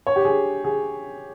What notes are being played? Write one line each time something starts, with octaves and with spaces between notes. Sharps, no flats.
C#5
G4
G#4
G#4